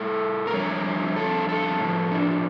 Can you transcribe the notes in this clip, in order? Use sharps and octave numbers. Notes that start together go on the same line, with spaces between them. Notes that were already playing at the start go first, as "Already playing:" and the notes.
Already playing: A2 G3 A4
A#4
F2 D3 G3 C#5
A4
A4
A2 F3
D4